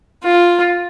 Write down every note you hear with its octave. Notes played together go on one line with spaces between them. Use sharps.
F4